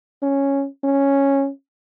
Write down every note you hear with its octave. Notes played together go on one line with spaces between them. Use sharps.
C#4
C#4